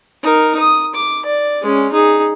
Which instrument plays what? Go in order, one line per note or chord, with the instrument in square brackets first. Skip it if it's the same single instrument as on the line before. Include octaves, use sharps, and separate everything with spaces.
[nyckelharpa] D#4 A#4
D#6
D6
D5
G#3 C#4
D#4 G#4